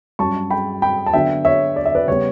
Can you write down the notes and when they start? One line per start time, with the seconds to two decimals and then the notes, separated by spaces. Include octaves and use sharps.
0.19 G2 F#3 C#4 A5 C#6
0.51 G5 B5
0.82 G5 B5
1.06 A5
1.13 D3 F#3 B3 D4 E5 G5
1.45 C#5 E5
1.76 D5
1.86 E5
1.95 B4 D5
2.07 C#3 G3 B3 C#5